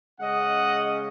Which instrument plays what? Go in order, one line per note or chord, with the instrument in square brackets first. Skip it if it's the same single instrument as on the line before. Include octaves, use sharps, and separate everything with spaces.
[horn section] C#3 G#3 C#4 D#5 F#5